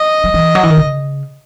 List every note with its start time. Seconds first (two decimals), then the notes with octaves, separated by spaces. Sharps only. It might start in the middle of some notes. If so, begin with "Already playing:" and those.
Already playing: D#5
0.24 F#3
0.34 E3
0.55 F#3
0.63 E3
0.70 D#3
0.77 C#3